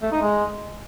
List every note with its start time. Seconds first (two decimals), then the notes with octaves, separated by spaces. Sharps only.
0.02 A3
0.12 D#4
0.22 G#3